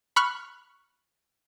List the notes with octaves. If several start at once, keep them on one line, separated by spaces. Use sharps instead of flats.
B5 C#6 F6 F#6